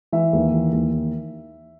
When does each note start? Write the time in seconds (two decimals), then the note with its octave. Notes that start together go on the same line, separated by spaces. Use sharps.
0.12 E3 E5
0.33 D#2
0.52 E3
0.72 D#2